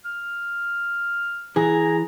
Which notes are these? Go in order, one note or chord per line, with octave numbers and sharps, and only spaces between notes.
F6
E3 G#4 A#5